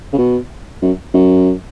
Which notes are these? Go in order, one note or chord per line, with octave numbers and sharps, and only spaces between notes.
C#3
B2
F#2
F#2